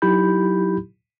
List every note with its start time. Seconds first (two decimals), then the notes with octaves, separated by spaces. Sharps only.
0.02 F#3 D#4 E4 G4 B5 G6